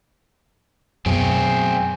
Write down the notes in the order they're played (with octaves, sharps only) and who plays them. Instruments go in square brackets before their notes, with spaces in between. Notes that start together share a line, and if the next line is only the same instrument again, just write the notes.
[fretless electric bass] F#2 B2 [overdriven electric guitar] C4 G#4